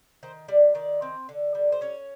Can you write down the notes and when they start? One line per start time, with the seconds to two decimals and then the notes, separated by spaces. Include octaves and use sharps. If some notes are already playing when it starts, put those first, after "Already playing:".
0.23 D#3 C5
0.48 G3 D5
0.75 D#3 D5
1.02 C4
1.29 D3
1.55 G3
1.72 C5
1.81 C#4 C#5